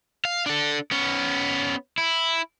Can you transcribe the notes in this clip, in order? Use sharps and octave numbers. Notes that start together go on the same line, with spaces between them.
F5
D4 A4
B3 C#4
E4